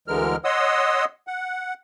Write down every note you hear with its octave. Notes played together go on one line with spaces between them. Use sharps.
D2 D3 E3 G#3 A#4 F6
C#5 D#5 F#5 C6 D#6 E6
F#5